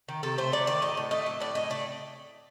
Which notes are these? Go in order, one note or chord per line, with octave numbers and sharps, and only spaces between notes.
D#3
C3 A4
A3 C5
F#3 D5
D#3 D5
A2 D#5
A2
A3 D#5
F#3
A2 D5
A2 D#5
A3 D5